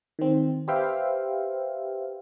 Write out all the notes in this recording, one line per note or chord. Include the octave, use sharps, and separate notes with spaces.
D#3 C4
G4 B4 C5 E5 F5 G5